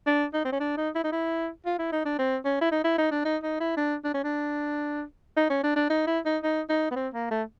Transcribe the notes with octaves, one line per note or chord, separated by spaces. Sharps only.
D4
D#4
C4
C#4
D4
D#4
E4
D#4
E4
F4
E4
D#4
D4
C4
C#4
E4
D#4
E4
D#4
D4
D#4
D#4
E4
D4
D4
C#4
D4
D#4
C#4
D4
D4
D#4
E4
D#4
D#4
D#4
B3
C4
A#3
A3